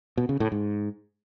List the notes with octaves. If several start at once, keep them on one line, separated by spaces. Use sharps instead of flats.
B2
C#3
A2
G#2